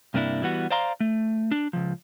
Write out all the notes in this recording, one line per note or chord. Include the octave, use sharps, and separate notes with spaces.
G2 C3 A#3 D4 E4
E3 G3 B3 F#4
C5 D5 F5 A#5 C6
A3
D4
C#2 F3